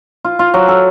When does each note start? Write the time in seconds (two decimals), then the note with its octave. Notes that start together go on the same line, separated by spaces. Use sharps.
0.24 F4
0.39 F4
0.54 F#3
0.68 A4